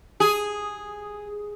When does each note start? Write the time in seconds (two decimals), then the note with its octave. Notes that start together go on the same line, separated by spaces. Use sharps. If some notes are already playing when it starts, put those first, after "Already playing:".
0.20 G#4